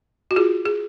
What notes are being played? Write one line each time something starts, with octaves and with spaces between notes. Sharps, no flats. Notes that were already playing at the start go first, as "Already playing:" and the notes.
F#4
F4 G#4
G#4